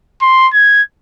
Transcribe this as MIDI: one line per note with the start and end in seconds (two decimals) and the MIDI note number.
0.22 0.48 84
0.53 0.82 92